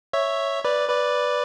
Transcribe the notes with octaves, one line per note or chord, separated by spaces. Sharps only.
C#5 E5
B4 D5
B4 D5